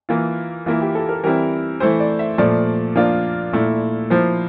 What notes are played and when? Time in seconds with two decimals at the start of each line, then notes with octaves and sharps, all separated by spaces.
0.09 E3 A#3 F4
0.66 E3 A#3 E4 F4
0.80 G4
0.95 A4
1.09 A#4
1.24 E3 G3 C4 E4 A#4
1.80 E3 A3 E4 C5
2.00 D5
2.19 E5
2.38 A#2 F3 A3 D5
2.95 F3 A#3 D4 F4
3.53 A#2 A3 E4
4.10 F3 A#3 E4 C5